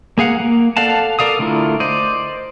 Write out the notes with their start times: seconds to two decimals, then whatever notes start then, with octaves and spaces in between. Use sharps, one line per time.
0.18 A#3 G#4 F5 F#5
0.40 A#3
0.77 A4 D5 F5 F#5 A5
1.19 A4 A#4 D5 F5 D#6
1.39 D3 A3 E4 F4 A#4
1.80 C5 D5 D#5